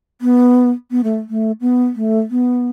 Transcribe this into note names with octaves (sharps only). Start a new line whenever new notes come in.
B3
B3
A3
A3
B3
A3
B3